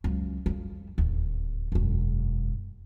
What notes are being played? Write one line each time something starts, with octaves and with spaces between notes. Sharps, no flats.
C#2 F#3
F2 G3
D1 D#2
E1 F#2